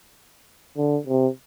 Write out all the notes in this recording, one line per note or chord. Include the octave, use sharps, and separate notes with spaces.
D3
C3